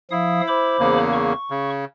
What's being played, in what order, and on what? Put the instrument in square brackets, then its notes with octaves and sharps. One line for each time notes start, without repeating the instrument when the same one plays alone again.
[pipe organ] F3 F5 D#6 [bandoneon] E4
[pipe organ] C5 B5 D6
[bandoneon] E2 C#3 A#3
[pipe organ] C#6
[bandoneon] C#3